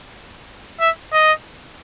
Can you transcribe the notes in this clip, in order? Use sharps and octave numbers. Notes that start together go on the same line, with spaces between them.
E5
D#5